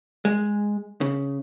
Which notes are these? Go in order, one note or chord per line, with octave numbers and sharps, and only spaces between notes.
G#3
C#3